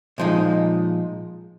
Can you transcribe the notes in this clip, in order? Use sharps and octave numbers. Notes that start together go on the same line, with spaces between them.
A#2 F3 G#3 D#4